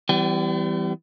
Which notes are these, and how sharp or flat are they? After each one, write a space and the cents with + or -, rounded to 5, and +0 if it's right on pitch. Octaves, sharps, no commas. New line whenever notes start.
E3 +0 G3 -15 B3 +45